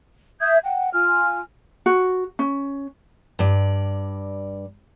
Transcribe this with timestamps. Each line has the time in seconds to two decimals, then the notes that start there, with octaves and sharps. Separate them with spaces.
0.40 E5 D#6 G6 G#6
0.63 F#5 G5
0.93 F4 G#5 F6
1.86 F#4
2.39 C#4
3.39 G2 D5